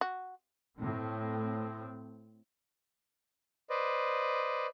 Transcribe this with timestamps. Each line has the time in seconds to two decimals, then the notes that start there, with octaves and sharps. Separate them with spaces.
0.01 F#4
0.78 A2 C4
3.70 B4 C5 D5 D#5